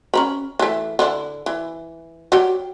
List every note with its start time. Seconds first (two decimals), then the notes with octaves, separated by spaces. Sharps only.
0.14 C#4 A#5 B5
0.59 E3 A3
0.99 D3 E4
1.46 E3
2.32 F#3 G4